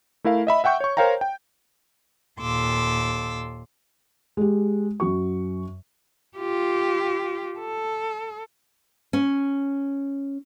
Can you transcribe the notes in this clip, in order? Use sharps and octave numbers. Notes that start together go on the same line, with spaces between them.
A3 E4 A#4 F5
D#5 E5 B5
E5 F#5 G5 C#6 G6
C#5 C#6
A#4 C5 C#5 F5 G5 A#5
G5
D#2 A#2 A4 C6 D6 E6
G#3 G4
F#2 F#4 C#6
F4 G4
A4
C#4